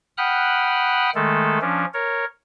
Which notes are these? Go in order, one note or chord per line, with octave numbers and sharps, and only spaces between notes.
F#5 G5 B5 D#6 F6 F#6
D#3 G#3 A3 A4
F3 C#4 D4
A#4 C#5